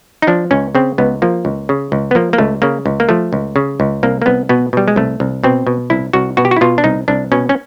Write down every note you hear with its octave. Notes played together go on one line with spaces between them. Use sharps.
D#4
F3 D4
C#2 C#4
C#3 C4
C#2 B3
F3 A#3
C#2
C#3
C#2
B3
F3 A#3
A#3
C#2 A3
C#3 A#3
C#2
A#3
F3 A3
C#2
C#3
C#2
C2 A#3
A#3
C2 B3
B2 B3
B2 G3
G#3
C2 A3
C2
B2 C4
B2
C2 E4
C2 F#4
B2 F#4
G4
F#4
E4
B2 F4
D4
C2 D#4
C2 D4
B2 C#4
C#4